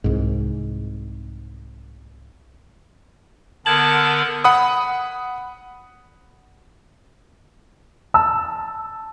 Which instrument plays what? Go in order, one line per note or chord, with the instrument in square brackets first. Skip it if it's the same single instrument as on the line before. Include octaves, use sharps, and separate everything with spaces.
[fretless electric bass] C2 G#2
[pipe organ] D3 B3 A#4 [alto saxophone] A5 [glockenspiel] G6 G#6 F#7
[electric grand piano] F#5 B5 D#6
[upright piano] A5 E6